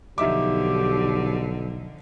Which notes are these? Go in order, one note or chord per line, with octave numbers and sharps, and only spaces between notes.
B1 D3 F3 D#4 G4 E5 D6